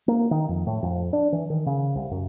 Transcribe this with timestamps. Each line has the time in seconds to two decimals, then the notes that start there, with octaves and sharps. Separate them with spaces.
0.08 A#3
0.31 D#3
0.49 F2
0.66 A2
0.82 F2
1.13 D4
1.32 E3
1.50 D#3
1.66 C#3
1.95 C2
2.11 F#2